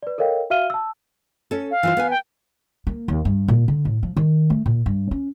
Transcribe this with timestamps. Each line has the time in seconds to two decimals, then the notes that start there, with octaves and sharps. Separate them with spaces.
0.03 B4 D5
0.18 A4 A#4 C#5 D#5 F5 G5
0.50 F#4 E5 F5 F6 D#7 G7
0.70 A5 E6
1.51 C#4 A4
1.71 F5
1.83 E3 F4 C5
1.97 B3 B4 G#5
2.10 G5
2.87 A#3
3.08 D#2
3.25 G2
3.48 A#2
3.68 D3
3.85 A2
4.03 F3
4.17 D#3
4.50 A3
4.66 A#2
4.86 G2
5.11 C#4